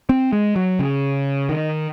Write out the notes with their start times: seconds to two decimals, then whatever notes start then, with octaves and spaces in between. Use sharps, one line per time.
0.09 C4
0.33 G#3
0.56 F#3
0.79 C#3
1.49 D#3